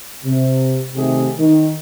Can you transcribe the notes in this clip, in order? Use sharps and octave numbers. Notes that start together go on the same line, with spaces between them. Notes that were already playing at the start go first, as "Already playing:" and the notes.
C3
C3 D#3 A3 G4 G#4
D#3